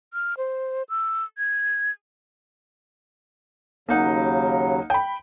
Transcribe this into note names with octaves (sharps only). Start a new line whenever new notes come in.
F6
C5
E6
G#6
D#2 C#3 F#3 A#3 D#4 F#5
G5 B5